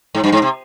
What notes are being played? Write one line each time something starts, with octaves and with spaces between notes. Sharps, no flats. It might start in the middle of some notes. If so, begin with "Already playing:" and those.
G#2
G2
G#2
C3